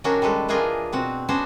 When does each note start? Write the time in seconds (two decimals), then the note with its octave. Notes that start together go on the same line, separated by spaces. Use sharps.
0.04 D#3 F#3 C#4 D4 F#4 A#4
0.22 G3 G#3 A4 B4
0.48 E3 D4 F4 G#4 A#4 D#5
0.93 B2 C4 F#4
1.28 B3 C#4 D4 F#4 C5